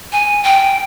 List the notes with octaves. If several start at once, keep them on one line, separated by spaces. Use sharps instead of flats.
G#5
G5